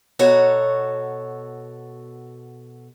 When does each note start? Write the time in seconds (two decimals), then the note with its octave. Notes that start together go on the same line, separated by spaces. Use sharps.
0.19 B2 F#4 A4 C#5 A#5